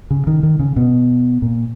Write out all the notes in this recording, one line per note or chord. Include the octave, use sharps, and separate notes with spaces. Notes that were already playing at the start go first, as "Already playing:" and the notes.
C#3
D#3
D#3
C#3
B2
A#2